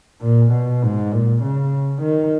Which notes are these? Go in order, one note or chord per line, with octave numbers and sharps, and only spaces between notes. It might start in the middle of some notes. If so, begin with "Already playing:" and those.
A#2
B2
G#2
A#2
C#3
D#3